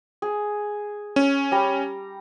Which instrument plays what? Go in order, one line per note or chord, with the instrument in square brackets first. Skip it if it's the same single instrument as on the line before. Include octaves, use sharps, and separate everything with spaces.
[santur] G#4
[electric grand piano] C#4
[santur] G3 A#5